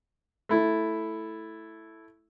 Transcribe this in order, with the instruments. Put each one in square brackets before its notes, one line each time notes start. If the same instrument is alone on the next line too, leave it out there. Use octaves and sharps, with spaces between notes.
[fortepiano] A3 E4